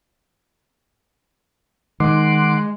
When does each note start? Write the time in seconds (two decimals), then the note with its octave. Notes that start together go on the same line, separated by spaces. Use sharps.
2.00 D#3 G#3 F#5 C6 D6